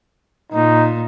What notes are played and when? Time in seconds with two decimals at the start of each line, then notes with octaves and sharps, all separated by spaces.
0.52 A#2 D#4